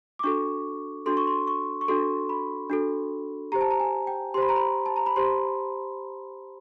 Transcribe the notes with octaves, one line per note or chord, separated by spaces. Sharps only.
D6
D4 F#4 A4 C#6
D4 F#4 A4 C6
C#6
C6
C#6
C#6
D4 F#4 A4 C6
B5
D4 F#4 A4
G4 C5 A#5
A5
A#5
G#5
G5
G4 C5 B5 C6
A#5
B5
A5
A#5
B5
G4 C5 C6